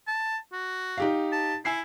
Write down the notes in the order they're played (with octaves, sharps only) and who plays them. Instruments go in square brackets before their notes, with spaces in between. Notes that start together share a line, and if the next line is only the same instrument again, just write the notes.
[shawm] A5
F#4
[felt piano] D#4 G4 F5
[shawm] A5
[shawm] E4 [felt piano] G#5 E6 C7